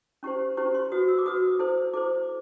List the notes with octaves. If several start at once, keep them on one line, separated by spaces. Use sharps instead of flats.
C#4 E4 G4 C5 C#6
C#4 E4 G4 C5 C#6
C6
F#4 B4 D#6
E6
D6
F#4 B4 D#6
E4 A4 C5
E4 A4 C5 D6